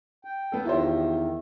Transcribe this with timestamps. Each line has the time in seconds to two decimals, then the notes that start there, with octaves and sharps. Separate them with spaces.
0.25 G5
0.52 B3 A4
0.65 E2 D#3 E4 F4 G4 C5 E5